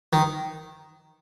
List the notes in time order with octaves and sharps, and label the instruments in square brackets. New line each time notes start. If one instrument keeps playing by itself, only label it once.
[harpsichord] D#3